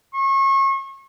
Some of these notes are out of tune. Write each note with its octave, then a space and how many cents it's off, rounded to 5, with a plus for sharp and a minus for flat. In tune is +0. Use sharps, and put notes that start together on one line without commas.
C#6 -35